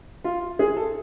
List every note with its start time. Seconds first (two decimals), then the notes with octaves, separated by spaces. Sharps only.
0.24 F4
0.59 G#4
0.76 A4